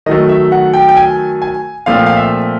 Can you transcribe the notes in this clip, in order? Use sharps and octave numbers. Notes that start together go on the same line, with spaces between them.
D#3 F#3 A3 D#5
E5
F#5
G5
G5
G#5
G#5
A#2 F3 A3 C4 F5
F5
E5